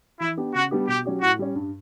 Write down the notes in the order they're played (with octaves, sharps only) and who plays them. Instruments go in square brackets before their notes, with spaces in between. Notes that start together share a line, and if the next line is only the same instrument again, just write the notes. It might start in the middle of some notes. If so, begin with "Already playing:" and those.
[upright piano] E3 [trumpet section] E4
[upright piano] B3 D4 G4
[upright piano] C#3 [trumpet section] F#4
[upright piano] G3 B3 D4 G4
[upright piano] B2 [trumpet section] G4
[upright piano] F#3 C#4 G4
[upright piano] A2 [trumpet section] F#4
[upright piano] G3 C#4
G2